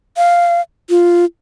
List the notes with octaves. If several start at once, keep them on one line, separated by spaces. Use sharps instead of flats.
F5
F4